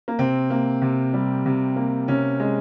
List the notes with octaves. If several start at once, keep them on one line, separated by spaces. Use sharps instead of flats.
A#3
C3 C4
A#3
C3
G3
C3
A#3
C3 C#4
G#3